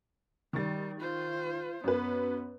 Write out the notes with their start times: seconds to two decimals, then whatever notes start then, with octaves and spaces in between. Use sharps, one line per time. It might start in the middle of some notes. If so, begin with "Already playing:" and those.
0.53 D#3 G3 A6
1.01 F4 C5
1.84 F#2 B3 B4